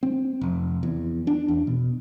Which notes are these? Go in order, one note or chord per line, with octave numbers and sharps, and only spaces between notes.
C4
F1
E2
D4
E2
B2